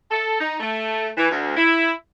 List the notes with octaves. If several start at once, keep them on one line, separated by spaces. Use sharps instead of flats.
A4
D#4
A3
E3
D2
E4